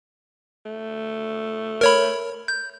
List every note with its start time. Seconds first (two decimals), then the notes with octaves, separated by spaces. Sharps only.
0.66 A3
1.81 A#4 C#5 B5
2.48 G6